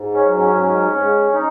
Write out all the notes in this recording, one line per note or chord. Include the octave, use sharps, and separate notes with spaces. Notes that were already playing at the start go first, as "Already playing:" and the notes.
Already playing: G#2
C#4
F#3
C#4
G#2 C#4
G#2
D#4